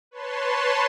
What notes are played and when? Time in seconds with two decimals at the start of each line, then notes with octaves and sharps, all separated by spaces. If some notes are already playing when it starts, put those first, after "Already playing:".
0.11 B4 C#5 A5 C6